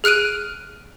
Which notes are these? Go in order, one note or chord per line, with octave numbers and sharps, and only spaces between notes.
G#4 F6 F#6 D7 D#7